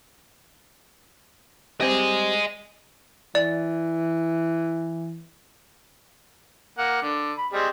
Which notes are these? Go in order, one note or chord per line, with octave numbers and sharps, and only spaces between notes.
G3 C4 G4 D#5 G#5
E3 D5
A#3 F#5
D3
B5
G3 G#3 C4